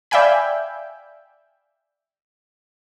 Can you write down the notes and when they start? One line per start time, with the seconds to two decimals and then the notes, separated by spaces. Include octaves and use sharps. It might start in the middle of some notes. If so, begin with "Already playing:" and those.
0.11 D5 E5 F5 G5 G#5 B5